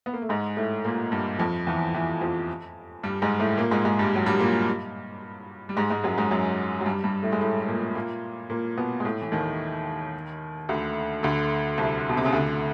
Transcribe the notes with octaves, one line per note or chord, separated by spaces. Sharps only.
B3
A#3
A3
G#2 G#3
A2 A3
A#2 A#3
G2 G3
F2 F3
E2 E3
E2 E3
F2 F3
G2 G3
G#2 G#3
A2 A3
A#2 A#3
G#2 G#3
G#2 G#3
G2 G3
F#3
G2 G3
A#2 A#3
G3
G#2 G#3
G#2 G#3
F#2 F#3
G#2 G#3
F#2 F#3
F#3
G2 G3
G2 G3
A2 A3
G#3
A2 A3
A3
A#2 A#3
A#2 A#3
A#2 A#3
B2 B3
G#3
A2 A3
E3
D#2 D#3
D2 D3
D2 D3
C2 C3
B2
C3
C#3
D2 D3